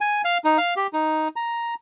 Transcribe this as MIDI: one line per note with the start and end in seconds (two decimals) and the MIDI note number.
0.01 0.22 80
0.25 0.38 77
0.44 0.58 63
0.58 0.74 77
0.76 0.87 67
0.93 1.28 63
1.36 1.74 82